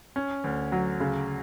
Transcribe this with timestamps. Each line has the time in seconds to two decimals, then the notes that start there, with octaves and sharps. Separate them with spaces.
0.16 C#4
0.44 D2
0.72 F#3
1.00 C#3